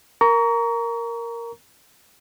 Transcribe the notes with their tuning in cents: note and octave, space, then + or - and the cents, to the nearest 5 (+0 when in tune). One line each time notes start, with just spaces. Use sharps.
A#4 +0 A#5 +0 C#6 +35